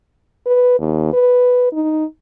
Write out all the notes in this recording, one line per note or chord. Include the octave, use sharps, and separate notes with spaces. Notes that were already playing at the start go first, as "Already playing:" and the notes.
B4
D#2
B4
D#4